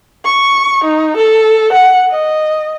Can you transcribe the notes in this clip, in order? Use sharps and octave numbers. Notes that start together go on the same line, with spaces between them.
C#6
D#4
A4
F#5
D#5